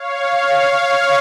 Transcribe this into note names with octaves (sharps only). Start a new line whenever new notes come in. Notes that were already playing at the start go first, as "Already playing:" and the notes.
Already playing: C#5 F5
C#5 F5
C#5 F5